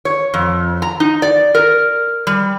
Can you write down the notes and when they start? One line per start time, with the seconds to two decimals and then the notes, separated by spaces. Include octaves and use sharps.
0.05 C#5
0.34 F2
0.82 A#5
1.00 D#4
1.22 D5
1.55 A#4
2.27 G3